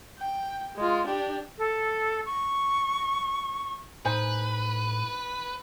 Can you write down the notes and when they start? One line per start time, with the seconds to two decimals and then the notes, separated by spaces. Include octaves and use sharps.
0.19 G5
0.76 G#3 F4
1.07 D4 G4
1.58 A4
2.26 C#6
4.05 A2 D#4 B4 C5 G#5